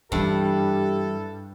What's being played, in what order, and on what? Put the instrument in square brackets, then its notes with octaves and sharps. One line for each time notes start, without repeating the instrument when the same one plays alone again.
[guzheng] G2 [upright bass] E3 G3 [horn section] E4 A4 [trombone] G4